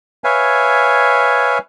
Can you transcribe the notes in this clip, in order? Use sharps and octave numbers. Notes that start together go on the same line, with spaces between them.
B4 C#5 E5 F5 G#5